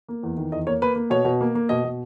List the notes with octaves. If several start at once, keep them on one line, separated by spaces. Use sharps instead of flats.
A#3
E2
D#3
E2 D#5
A#3 C#5
A#3 B4
A#3
B2 C#5
B2
A#3
A#3
B2 D#5
B2